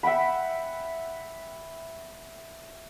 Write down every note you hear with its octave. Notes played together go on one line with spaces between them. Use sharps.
E5 F#5 G5 B5